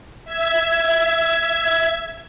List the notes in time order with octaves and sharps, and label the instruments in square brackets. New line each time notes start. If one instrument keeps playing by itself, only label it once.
[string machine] E5 G#6